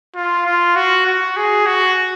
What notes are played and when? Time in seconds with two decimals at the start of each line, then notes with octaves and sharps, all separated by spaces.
0.15 F4
0.46 F4
0.76 F#4
1.06 F#4
1.37 G#4
1.67 F#4